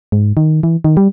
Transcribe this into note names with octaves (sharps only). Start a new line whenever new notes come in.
G#2
D#3
E3
D#3
G3